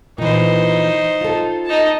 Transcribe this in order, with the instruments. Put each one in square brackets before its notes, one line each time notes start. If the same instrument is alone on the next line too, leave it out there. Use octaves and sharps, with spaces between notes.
[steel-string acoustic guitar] A#2 E3 [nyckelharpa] D#4 C5
[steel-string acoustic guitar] F4 A4
[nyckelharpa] D#4 A5